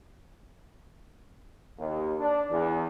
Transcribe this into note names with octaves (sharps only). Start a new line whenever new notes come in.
D#2
D4
E2